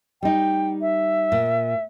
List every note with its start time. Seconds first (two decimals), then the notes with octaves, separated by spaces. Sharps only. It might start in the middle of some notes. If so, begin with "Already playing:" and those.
0.23 G3 D#4 G5
0.81 E5
1.32 A#2